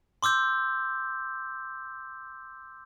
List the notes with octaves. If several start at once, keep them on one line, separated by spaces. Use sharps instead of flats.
C6 D6 E6 G6